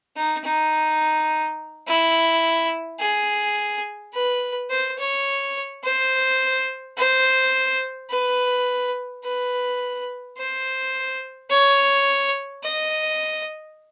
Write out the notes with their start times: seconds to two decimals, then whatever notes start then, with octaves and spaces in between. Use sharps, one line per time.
0.17 D#4
0.44 D#4
1.87 E4
3.00 G#4
4.13 B4
4.70 C5
4.98 C#5
5.84 C5
6.97 C5
8.10 B4
9.24 B4
10.37 C5
11.50 C#5
12.63 D#5